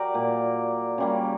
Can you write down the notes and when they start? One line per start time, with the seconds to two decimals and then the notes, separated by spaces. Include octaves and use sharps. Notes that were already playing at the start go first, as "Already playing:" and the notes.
Already playing: F#3 G4 A#4 D5
0.14 A#2 A#3
0.98 C#3 G3 A#3